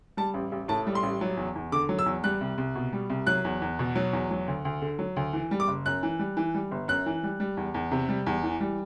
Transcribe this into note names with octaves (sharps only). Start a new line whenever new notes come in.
G3 A5
A1
A1
A2 A5
G3
C6
A1
F#3
E2
E2
D3 D6
F#3
E6
E2
G3 F#6
C2
C2
B2
G3
C2
F#3 F#6
E2
E2
B2
F#3
E2
F#3
D2
D2
D3
F#3
D2
E3
G3
D6
F#1
F#2 F#6
E3
G3
E3
G3
G1
F#2 F#6
E3
G3
G3
E2
E2
C3
G3
E2
E3
G3